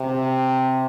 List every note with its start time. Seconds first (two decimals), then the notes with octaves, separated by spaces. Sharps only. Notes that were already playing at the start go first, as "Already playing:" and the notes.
Already playing: C3